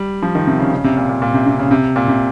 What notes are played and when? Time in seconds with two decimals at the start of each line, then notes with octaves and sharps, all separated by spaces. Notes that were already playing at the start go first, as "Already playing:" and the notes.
Already playing: G3
0.22 F3
0.35 D#3
0.47 C3
0.60 C#3
0.72 C#3
0.84 C3
0.97 A#2
1.09 A#2
1.22 A#2
1.34 C3
1.46 C3
1.59 C#3
1.71 C3
1.96 A#2
2.08 C3